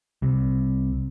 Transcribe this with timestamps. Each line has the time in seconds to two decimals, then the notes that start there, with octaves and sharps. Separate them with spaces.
0.22 C2 C3